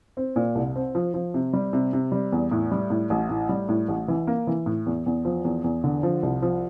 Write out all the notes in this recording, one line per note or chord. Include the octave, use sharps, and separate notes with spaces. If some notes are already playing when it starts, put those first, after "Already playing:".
C4
A#2
C2
C4
F3
F3
C3
G3
C3
C3
G3
E2
A2
G3
A2
A1
A2
G3
A2
A1
E3
A#3
E3
A2
E2
E2
F3
E2
E2
D3
F3
C2
F3